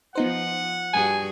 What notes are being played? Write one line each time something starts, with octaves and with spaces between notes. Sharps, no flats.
F3 B3 D#4 F4 C5 F#5
G2 F#4 G#4 G#5